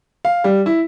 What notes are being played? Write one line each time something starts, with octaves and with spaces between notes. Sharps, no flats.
F5
G3
E4